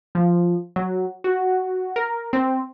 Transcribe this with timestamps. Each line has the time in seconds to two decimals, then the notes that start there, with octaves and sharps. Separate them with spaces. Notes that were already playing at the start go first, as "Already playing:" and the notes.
0.15 F3
0.76 F#3
1.24 F#4
1.96 A#4
2.33 C4